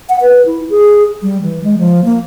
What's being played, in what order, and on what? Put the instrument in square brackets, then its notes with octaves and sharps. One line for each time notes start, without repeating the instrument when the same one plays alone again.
[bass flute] F#5
B4
E4
G#4
G3
E3
G#3
F3
A#3